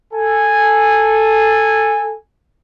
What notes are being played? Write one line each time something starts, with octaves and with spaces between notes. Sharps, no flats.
A4 G#5